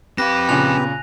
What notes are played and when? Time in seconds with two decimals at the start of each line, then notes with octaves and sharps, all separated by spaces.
0.18 C4 G4 B4 F5 A#6
0.49 A#2 C#3 G#5 F#6 F7